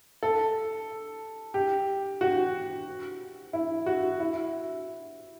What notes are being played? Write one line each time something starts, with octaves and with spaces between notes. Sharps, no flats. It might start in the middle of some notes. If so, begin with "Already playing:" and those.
A4
G4
F#4
E4
F#4
E4